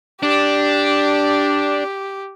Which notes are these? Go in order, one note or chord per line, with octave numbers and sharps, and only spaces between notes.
D4 G4